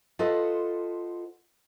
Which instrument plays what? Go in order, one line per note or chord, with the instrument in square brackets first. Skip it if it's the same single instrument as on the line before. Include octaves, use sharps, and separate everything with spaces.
[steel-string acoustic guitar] F4 A4 B4 C5 D#5 F#5